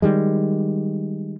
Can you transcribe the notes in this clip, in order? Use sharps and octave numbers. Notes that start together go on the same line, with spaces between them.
D#3 G3 G#3